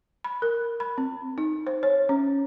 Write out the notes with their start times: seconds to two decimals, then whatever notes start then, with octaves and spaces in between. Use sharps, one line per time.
0.24 B5
0.42 A#4
0.80 B5
0.98 C4
1.38 D#4
1.67 C5
1.83 C#5
2.09 C#4